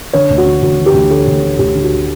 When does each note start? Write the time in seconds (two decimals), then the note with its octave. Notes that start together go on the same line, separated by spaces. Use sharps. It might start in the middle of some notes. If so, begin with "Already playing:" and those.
0.13 D3 C#5
0.30 D2
0.38 F#4
0.46 D3
0.62 D2 F#4
0.79 D3
0.86 G4
0.94 D2
1.10 D3 A4
1.27 D2
1.43 D3
1.59 D2 G4
1.75 D3
1.83 F#4